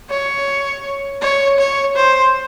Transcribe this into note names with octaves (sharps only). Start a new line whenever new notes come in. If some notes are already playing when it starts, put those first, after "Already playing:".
C#5
C#5
C#5
C5